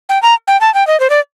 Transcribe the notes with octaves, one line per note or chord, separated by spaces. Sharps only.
G5
A#5
G5
A5
G5
D#5
C5
D5